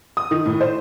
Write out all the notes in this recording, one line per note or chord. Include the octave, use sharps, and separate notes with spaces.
D#6
D#3
A2
C5